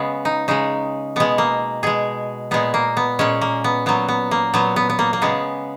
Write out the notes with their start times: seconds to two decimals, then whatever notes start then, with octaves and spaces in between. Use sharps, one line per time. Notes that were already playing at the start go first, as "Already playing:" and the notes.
Already playing: C#3 G#3 B3
0.25 D#4
0.48 C#3 G#3 D#4
1.16 B2 G#3 B3
1.38 A#3
1.83 B2 G#3 G#4
2.51 A#2 G#3 B3
2.74 A#3
2.97 B3
3.19 A#2 G#3 C#4
3.41 A#3
3.64 B3
3.86 A#2 F#3 B3
4.08 B3
4.31 A#3
4.54 A#2 F#3 B3
4.76 B3
4.90 B3
4.99 A#3
5.13 A#3
5.22 C#3 G#3 B3